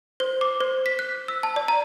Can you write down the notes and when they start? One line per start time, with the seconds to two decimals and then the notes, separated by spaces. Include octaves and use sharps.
0.20 C5
0.41 D6
0.61 C5
0.86 B6
0.99 F#6
1.28 E6
1.43 A5
1.56 D5
1.68 A#5